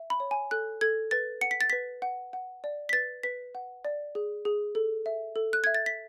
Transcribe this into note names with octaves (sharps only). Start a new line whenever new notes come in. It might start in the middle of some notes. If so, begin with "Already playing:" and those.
Already playing: E5
B5
C#5
G#5
A4 F#6
A4 G#6
B4 A6
F#5 C#7
B6
A6
B4 B6
F#5
F#5
D5
B6
B4 A6
B4 B6
F#5
D5
G#4
G#4
A4
E5
A4
F#6
E5 G#6
A6
B6